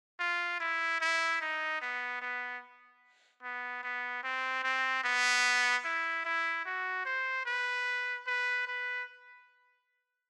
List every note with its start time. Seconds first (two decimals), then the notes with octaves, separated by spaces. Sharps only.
0.20 F4
0.60 E4
1.01 E4
1.41 D#4
1.81 B3
2.21 B3
3.43 B3
3.83 B3
4.24 C4
4.63 C4
5.04 B3
5.85 E4
6.25 E4
6.65 F#4
7.05 C5
7.46 B4
8.27 B4
8.67 B4